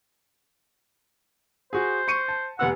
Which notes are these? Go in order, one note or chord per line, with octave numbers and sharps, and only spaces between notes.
F#4 G#4 C5
C#6 C#7 D#7
A5
F1 B3 F#5 E6